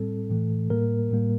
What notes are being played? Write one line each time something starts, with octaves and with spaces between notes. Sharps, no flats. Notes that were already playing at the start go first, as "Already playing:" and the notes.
Already playing: A2 G3 C4 A4
A2 E3 A3
A2 G3 A#3 A#4
A2 G3 A#3